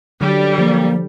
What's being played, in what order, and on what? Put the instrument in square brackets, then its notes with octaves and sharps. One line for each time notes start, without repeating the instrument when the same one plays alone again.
[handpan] D3 F#3 [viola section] G3
[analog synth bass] F3 [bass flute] A#3